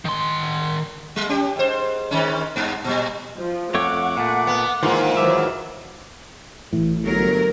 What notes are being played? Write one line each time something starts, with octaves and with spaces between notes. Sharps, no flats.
D#3 C6
G3
C#4 G4
G#2 C5
G#2 D#3 C#4
G2 B3
A#2 G3
F3
F2 A3 C#5 F#5 D6
A#2 A3
B3
G#2 D#3 E3 A#3 F4
D#3 E3 F#3 E5 D6
A1 A2 E3
G1 F#3 A#4